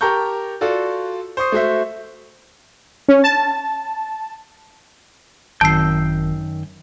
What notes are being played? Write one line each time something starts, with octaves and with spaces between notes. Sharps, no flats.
G4 A#4 A5 A#5 C#6 G6
F4 F#4 A4 D5
C5 C#6 D#6 C7
A3 F#4 C5 E5
C#4
A5
G#1 F#2 D#3 A5 E6 G6 C7